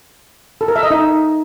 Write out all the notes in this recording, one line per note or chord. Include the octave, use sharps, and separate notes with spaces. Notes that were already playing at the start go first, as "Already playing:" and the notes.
A4
A#4
E5
D#5
D#4